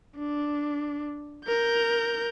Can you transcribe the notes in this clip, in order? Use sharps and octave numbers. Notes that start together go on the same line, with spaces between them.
D4
A#4 G6